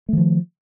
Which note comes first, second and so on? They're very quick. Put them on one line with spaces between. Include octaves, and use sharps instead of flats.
A3 D#3 F3